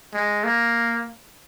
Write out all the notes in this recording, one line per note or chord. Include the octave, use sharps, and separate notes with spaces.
G#3
A#3